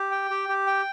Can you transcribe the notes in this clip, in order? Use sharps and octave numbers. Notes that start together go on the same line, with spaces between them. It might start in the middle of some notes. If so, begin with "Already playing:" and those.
Already playing: G4
G5
G4
G4
G5